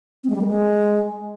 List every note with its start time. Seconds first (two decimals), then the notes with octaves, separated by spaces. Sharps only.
0.24 C4
0.30 G#3
0.35 G3
0.41 A#3
0.47 G#3